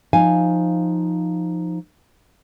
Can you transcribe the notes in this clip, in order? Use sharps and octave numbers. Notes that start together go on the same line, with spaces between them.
F3 D#4 F5 G#5